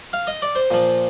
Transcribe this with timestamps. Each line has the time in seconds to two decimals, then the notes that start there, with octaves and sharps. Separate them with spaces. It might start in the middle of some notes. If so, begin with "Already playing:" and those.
0.13 F5
0.27 D#5
0.42 D5
0.55 C5
0.71 A#2 F3